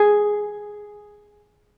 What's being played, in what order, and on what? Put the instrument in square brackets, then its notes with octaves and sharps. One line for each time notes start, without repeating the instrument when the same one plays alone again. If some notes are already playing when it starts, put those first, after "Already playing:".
Already playing: [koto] G#4